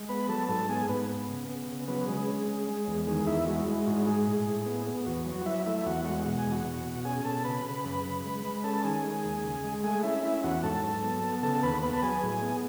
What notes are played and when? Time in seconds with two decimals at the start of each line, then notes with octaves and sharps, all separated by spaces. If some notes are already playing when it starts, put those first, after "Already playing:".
Already playing: G#3
0.09 B3 B4 B5
0.28 F#3 A4 A5
0.49 G#2 A4 A5
0.69 B3 G#4 G#5
0.89 G#2 B3 B4
1.09 B3
1.28 C#3
1.49 B3
1.68 C#3
1.88 F#3 B3 B4
2.07 C#3 G#3 G#4
2.28 C#4
2.47 C#4
2.68 G#3
2.87 E2
3.07 D#3 G#3 G#4
3.27 E2 E4 E5
3.47 G#3 F#4
3.67 G#3 E4
3.87 G#2 F#4
4.06 G#3 G#4
4.27 A2
4.47 A2
4.66 B3
4.87 B3
5.06 E2 F#4
5.26 F#3
5.42 F#5
5.46 F#3 E4 E5
5.66 A3 E4 E5
5.79 E5
5.86 E2 F#4 F#5
6.05 G#3 F#4 F#5
6.26 B2 F#5
6.38 G#5
6.46 E2
6.52 F#4 F#5
6.65 B2
6.85 B2
7.05 C#4 G#4 G#5
7.25 B2 A4 A5
7.44 C#3 B4 B5
7.65 C#3
7.85 F#2 B4 B5
8.05 C#3
8.25 G#3
8.45 G#3
8.64 C#4 A4 A5
8.84 D#3 G#4 G#5
9.04 G#3
9.25 D#2
9.44 C#3
9.64 G#3
9.84 A3 G#4 G#5
10.03 C#4 E4 E5
10.23 C#4 E4 E5
10.44 E2 F#4 F#5
10.63 G#2 A4 A5
10.84 F#3
11.03 B3
11.23 B3
11.42 C#3 A4 A5
11.63 D#2 B4 B5
11.83 B3 B4 B5
11.93 A5
12.02 F#3 G#4 G#5
12.23 A2
12.42 B3